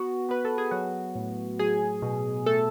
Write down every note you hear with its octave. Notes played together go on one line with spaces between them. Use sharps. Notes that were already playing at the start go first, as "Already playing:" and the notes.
Already playing: B3 F#4
B3 B4
A4
G#4
F#3 F#4
A2
F#3 G#4
B2
A3 A4